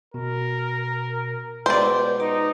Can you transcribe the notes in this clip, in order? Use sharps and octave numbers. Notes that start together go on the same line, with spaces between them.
B2 A#4
C#2 B2 B3 C5 D5 G5
D#4 D6